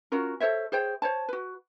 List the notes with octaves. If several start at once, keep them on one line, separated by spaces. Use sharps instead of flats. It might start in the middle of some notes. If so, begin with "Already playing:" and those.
C#4 F4 F#4 A#4
A4 C5 C#5 E5
G#4 C5 C#5 G5
C5 C#5 A5
F#4 B4